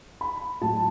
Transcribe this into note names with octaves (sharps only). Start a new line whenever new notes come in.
B5
A2 F#3 A5